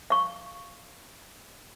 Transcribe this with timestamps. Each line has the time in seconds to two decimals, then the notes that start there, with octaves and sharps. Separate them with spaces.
0.10 F5 C#6